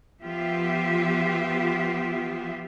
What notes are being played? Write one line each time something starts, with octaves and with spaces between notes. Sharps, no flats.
F3 B3 F4 G4 E5